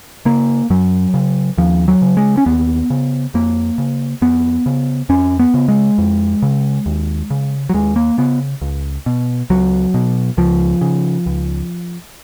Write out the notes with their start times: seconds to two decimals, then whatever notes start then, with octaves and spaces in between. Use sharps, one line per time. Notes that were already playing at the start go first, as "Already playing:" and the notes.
0.25 C#3 A#3
0.70 F#2 F#3
1.14 C#3
1.58 D#2 F3
1.88 F#3
2.02 C#3
2.17 G#3
2.37 C#4
2.46 D#2 B3
2.90 C#3
3.34 F2 A#3
3.78 C#3
4.22 F2 B3
4.66 C#3
5.09 F2 C#4
5.39 B3
5.54 C#3
5.68 G#3
5.98 F2
6.42 C#3
6.86 D#2
7.30 C#3
7.69 F#3
7.74 D#2 G#3
7.96 A#3
8.18 C#3 B3
8.61 C#2
9.06 B2
9.50 C#2 F#3
9.94 B2
10.37 C#2 F3
10.81 C#3
11.26 C#2